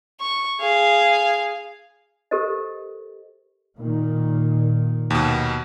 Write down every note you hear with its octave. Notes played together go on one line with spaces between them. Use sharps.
C#6
G#4 F5
G4 A4 A#4 C5 D#5
A#2 D#3
D#2 B2